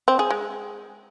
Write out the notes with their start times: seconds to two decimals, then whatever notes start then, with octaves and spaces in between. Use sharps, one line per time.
0.08 C4
0.19 G#4
0.30 G#3